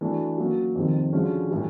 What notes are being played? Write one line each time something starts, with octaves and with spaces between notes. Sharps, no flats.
E3 A3 D4 F#4
F#3 A#3 C#4 F#4
F2 C3 D#3 G3
D3 F3 G#3 C#4 F#4
A2 E3 G3